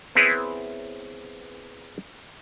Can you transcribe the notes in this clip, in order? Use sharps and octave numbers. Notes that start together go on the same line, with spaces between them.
B3 C4 E4 G#4 B4 C#5